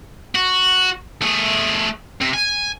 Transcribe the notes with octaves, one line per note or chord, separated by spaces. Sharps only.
F#4
A3 G#4
C3
G#5